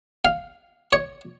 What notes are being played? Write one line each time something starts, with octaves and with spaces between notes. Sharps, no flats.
F5
C#5